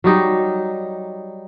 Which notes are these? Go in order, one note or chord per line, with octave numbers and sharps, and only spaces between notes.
F#3 G3 D#4